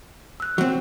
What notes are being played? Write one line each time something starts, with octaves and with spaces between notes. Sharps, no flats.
E6 F#6
F#3 C4